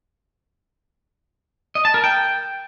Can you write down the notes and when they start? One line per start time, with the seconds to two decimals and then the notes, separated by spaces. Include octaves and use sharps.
1.75 D#5
1.85 A5
1.94 A#4
2.04 G5